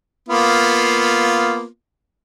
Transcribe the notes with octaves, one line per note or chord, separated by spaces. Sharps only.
A#3 B3 F4